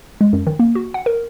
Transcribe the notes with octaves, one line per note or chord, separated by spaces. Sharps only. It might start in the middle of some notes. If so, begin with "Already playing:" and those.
G#3
F#2
D#3
A#3
F#4
F#5
A#4